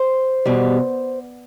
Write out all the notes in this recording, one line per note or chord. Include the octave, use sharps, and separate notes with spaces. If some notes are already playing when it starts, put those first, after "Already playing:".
Already playing: C5
E2 B2 G3